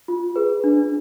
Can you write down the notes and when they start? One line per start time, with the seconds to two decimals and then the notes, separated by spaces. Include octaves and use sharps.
0.08 F4
0.36 G#4 B4
0.64 D4